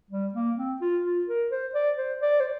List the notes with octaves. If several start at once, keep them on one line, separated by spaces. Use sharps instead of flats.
G3
A#3
C4
F4
F4
A#4
C5
D5
C5
D5
C5